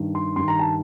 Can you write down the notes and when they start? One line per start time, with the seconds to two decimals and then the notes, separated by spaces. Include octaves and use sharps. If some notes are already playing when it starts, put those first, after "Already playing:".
Already playing: G2 D#3
0.15 C6
0.36 G2 D#3 C6
0.48 A#5
0.59 A5